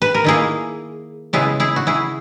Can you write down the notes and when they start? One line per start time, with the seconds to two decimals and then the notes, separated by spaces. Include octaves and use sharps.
0.02 B4
0.14 A#4
0.24 D#3 A#3 E4 G#4
1.33 C#3 G#3 B3 E4 G#4
1.60 E4 G#4
1.76 F#4
1.87 E4 G#4